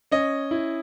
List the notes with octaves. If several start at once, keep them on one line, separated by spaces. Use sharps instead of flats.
C#4 D#5
E4